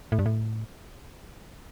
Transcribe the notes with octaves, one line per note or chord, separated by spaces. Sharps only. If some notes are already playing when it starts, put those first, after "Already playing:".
A2
G2
A2